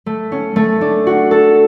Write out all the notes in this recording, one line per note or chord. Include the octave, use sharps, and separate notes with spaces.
A3
C#4
A3
D4
F#4
A4